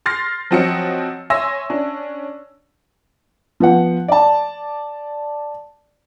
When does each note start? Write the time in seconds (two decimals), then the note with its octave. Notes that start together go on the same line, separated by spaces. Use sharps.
0.06 C6 F6 A6 A#6 C7
0.51 F3 F#3 C4 F#4 D#5 C#7
1.30 C#5 E5 G#5 C6 E6 A#6
1.70 C#4 D4
3.60 F3 B3 F#5
4.08 D5 A5